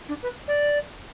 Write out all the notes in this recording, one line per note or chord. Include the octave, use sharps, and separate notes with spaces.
D4
B4
D5